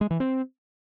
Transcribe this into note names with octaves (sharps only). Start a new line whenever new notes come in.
G#3
E3
C4